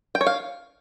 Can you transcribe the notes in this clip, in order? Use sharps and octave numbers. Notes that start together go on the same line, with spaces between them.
G5
C#5
F5